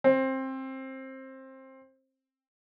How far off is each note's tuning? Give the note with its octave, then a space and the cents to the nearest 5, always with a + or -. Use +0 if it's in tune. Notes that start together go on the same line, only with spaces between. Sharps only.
C4 +20